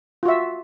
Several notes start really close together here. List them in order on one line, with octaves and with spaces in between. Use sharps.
F4 F#4 E5